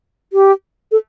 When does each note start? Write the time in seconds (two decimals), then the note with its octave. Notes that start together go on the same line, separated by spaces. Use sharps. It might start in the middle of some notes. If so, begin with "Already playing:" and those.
0.33 G4
0.92 A4